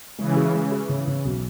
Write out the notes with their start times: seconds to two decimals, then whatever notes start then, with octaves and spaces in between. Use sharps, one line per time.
0.18 C#3 E3 G#3
0.36 G#4
0.54 G#3
0.72 G#4
0.89 C#3
1.07 C#3
1.25 B1